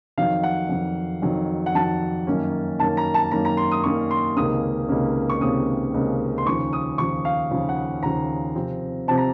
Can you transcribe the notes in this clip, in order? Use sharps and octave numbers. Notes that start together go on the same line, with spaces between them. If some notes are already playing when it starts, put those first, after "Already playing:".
F2 D#3 F#3 F5
F#5
F2 D#3 F#3
F2 D#3 F#3
F#5
F2 D#3 F#3 A5
F#2 D#3 A#3 C#4
F#2 D#3 A#3 C#4 A5
A#5
A5
F#2 D#3 A#3 C#4 A#5
A#5
C6
D#6
F#2 D#3 A#3 C#4 C#6
C6
C#2 C3 D#3 A#3 C#4 D#6
C#2 C3 D#3 A#3 C#4
C#6
C#2 C3 D#3 A#3 C#4 D#6
C#2 C3 D#3 A#3 C#4
C6
D#2 C#3 F3 C#6
D#6
D#2 C#3 F3 C#6
F5
D#2 C#3 F3
F#5
D#2 C#3 F3 A#5
C3 F3 C4
C3 F3 C4 A5
A#5